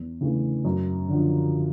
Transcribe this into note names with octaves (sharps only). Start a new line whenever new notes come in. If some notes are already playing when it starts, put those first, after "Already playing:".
Already playing: E2
C#3 E3 A3
F#2
D3 F3